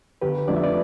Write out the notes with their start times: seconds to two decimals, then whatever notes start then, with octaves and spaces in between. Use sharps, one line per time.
0.22 G1 G4 B4
0.48 F2 D3 F3 A3 D5
0.56 E5
0.64 B4 D5